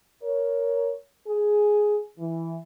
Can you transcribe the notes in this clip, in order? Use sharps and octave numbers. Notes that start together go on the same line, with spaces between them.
A#4 C#5
G#4
E3